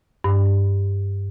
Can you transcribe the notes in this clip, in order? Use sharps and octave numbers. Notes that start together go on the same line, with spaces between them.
G2